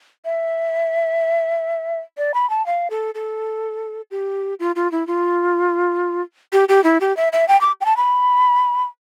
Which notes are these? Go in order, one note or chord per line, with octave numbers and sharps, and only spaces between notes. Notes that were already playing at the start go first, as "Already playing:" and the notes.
E5
D5
B5
A5
F5
A4
A4
G4
F4
F4
E4
F4
G4
G4
E4
G4
E5
E5
G5
D6
G5
A5
B5